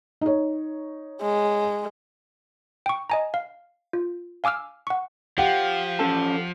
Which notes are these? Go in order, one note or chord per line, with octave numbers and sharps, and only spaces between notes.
D#4 C#5
G#3
G5 C#6
D#5 G#5 A#5
F5
F4
F5 G#5 D6 E6 F6
F#5 C#6
F3 G4 F5 F#5
C#4 A4 A5